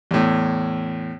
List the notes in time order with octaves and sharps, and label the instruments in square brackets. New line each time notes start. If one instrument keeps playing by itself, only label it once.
[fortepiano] E2 A2